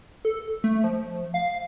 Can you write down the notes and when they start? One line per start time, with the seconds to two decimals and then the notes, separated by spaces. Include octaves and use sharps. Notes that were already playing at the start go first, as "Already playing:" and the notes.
0.25 A4
0.64 A3
0.84 F3
1.34 F5